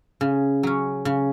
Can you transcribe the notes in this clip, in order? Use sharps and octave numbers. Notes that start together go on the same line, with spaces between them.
C#3
F#3 C#4
C#3